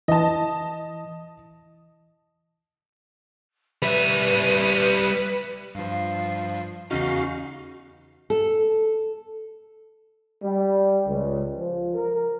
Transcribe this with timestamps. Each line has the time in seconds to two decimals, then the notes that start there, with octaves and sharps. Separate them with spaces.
0.08 E3 D#5 A5
3.82 G3 B4 E5 D#7
5.75 G2 F3 F5
6.91 E2 C#3 C#4 D#4 F#4 F5
8.30 A4
10.42 G3
11.07 C#2
11.56 F3
11.93 A#4